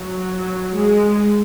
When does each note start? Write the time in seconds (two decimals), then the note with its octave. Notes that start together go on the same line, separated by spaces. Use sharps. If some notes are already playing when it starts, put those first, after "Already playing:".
Already playing: F#3
0.74 G#3